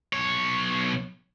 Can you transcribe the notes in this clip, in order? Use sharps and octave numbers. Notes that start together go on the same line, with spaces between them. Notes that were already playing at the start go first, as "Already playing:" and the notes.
B1 C#5